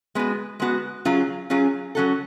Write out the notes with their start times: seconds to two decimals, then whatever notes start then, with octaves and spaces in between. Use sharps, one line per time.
0.15 G#3 B3 F#4
0.60 G#3 B3 F#4
1.05 F#3 C#4 F4 G#4
1.50 F#3 C#4 F4 G#4
1.95 F#3 C#4 F#4 A4